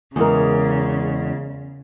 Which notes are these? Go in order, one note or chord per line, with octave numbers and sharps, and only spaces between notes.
E2 C#3 G#3 A#4